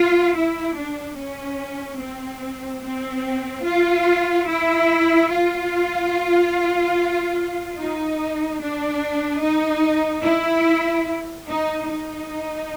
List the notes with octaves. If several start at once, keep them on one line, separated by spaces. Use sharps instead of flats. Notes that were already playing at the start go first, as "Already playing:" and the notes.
Already playing: F4
E4
D4
C#4
C4
C4
F4
E4
F4
D#4
D4
D#4
E4
D#4
D#4